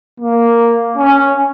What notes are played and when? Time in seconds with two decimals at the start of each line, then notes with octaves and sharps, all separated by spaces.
0.20 A#3
0.97 C#4